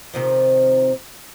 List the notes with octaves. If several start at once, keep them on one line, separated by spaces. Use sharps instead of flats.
C3 D#3 F3